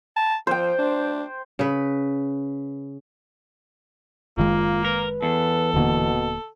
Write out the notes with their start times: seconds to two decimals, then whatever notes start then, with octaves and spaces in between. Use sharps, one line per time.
0.16 A5
0.47 F3 C5 G5
0.78 D4
1.59 C#3 B4
4.38 F#1 D#3 G#3 A#3 F4
4.85 A#4 B4
5.22 E2 A4
5.74 D#1 B2 D3 A#3